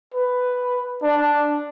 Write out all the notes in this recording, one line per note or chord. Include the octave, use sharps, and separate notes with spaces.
B4
D4